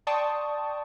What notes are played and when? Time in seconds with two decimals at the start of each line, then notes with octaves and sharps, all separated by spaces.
0.07 D5 G5 A5 C6 C#6 D#6